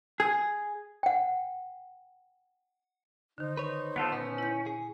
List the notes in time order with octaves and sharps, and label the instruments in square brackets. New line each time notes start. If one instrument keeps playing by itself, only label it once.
[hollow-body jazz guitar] G#4
[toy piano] F#5 G5
[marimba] D3 D#3 [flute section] D#4 C5
[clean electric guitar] B4 C#5
[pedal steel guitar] B3 F4 A4 [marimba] A5
[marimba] A#2 [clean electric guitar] B3 [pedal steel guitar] C#4
[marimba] E4 G6
[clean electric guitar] G#4